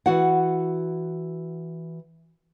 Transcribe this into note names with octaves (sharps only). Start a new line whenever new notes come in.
E3 F#4 F#5